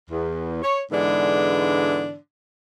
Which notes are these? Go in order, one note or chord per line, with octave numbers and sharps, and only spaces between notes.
E2
C#5
G#2 D3 E3 G#3 B3 D4